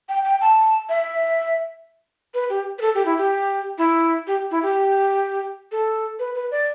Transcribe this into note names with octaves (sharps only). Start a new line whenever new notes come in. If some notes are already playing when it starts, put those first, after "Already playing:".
G5
G5
A5
E5
B4
G4
B4
A4
G4
E4
G4
E4
G4
E4
G4
A4
B4
B4
D5